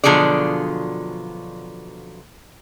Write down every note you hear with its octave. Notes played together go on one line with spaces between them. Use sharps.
B2 D3 F3 F#3 G#4 D5